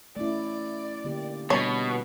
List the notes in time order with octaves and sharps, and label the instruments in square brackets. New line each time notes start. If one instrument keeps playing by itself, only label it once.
[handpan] A3 C#4 E4 [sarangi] D5
[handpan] D3 A#3 G4
[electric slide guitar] B2 [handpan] G3 D4 [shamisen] C#5